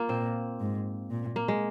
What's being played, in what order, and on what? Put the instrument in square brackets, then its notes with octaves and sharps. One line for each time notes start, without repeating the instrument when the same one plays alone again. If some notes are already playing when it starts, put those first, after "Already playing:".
Already playing: [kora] A#3 F4
[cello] A#2 [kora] C4
[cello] G#2
A#2
[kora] A#3
G#3